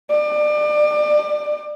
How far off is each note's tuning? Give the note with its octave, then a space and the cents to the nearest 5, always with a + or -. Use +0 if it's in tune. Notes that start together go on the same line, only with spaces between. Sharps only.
D5 +30